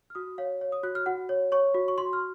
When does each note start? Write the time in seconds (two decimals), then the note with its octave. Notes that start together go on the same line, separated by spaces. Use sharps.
0.10 F6
0.15 F#4 D#6
0.38 C#5 F5
0.61 C#5 F5
0.72 D#6
0.83 F#4 F#6
0.95 F6
1.06 F#4 F#5
1.29 C#5
1.52 C#5 C#6
1.74 F#4
1.88 C#6
1.98 F#4 C6
2.13 F6